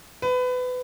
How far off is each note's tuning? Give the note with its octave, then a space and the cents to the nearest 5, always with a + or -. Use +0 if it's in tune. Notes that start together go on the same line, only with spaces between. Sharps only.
B4 +25